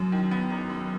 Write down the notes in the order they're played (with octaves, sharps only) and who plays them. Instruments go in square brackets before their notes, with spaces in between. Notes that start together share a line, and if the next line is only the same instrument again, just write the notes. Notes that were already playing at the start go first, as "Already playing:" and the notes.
Already playing: [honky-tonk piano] F#2 [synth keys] F#3
[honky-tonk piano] D#3
B3
G#1
F#2